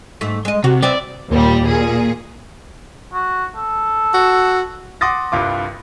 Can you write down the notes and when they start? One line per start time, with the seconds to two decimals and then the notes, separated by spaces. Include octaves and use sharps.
0.21 G#2 A3
0.45 G#3 D#5
0.64 C3 F#4
0.82 B3 C4 E4 D5
1.29 D#2 A#2 G3
1.63 A#2 G#4
3.13 F#4
3.56 A4
4.14 F#4
5.01 F#5 C6 D6 D#6 A6 A#6
5.32 C2 G2 F4 D6